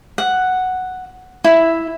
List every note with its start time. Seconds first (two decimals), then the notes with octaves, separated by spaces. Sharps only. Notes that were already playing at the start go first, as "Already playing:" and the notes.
0.18 F#5
1.44 E4